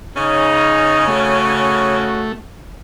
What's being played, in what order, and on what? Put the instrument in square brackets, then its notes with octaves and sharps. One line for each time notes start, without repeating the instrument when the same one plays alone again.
[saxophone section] C#3 C#4 [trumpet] D#4
[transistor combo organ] A3 [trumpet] F#4